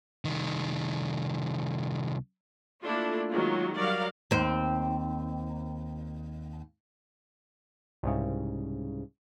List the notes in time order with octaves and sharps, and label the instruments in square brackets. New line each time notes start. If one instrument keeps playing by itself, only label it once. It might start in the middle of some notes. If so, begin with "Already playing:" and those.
[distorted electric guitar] C2 D#3
[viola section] A3 A#3 D4 E4 F4 A4
D#3 F#3 G#3 A#3 F4
F#3 G3 A#4 D5 F5
[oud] D#2 C4
[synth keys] C2 G#2 C#3